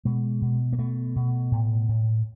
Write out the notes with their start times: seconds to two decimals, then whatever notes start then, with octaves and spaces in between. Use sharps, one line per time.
0.05 B2 G#3
0.42 B2
0.73 A#3
0.78 B2 A3
1.16 B2
1.51 A2
1.89 A2